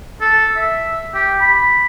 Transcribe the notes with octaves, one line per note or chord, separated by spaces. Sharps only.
A4
E5
G4
B5